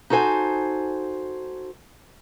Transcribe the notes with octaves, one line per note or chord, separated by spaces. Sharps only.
D#4 F#4 A4 C5 G#5